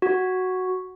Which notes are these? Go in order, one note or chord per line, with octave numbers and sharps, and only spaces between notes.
F#4